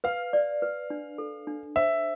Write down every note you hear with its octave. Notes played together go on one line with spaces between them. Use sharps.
B4 F5
D5
B4
D4
A4
D4
C5 E5